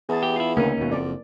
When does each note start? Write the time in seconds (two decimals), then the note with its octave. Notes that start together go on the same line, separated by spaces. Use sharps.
0.09 E2 G#4 A5
0.23 G4
0.36 E4 F4
0.57 D2 C#3 A#3 C#4 D#4
0.77 D#2 B2
0.92 F#1 F2 D5